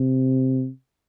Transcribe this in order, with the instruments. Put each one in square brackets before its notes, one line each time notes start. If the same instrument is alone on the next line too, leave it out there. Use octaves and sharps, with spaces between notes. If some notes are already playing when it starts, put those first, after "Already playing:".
Already playing: [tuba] C3